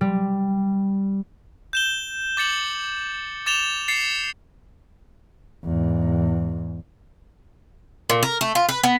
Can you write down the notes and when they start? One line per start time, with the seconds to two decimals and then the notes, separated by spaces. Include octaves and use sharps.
0.01 G3
1.73 G6 E7 G7
2.37 D6 A6 C#7 F#7
3.46 D6 A6 E7 F7 G7
3.88 A6 C7 C#7
5.64 E2 G#2
8.10 A#2
8.23 A#4
8.41 A3
8.55 F4
8.69 B4
8.84 B3